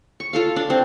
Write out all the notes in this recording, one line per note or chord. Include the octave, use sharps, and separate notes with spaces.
C#6
F4 A4 F5
D4
C4 C5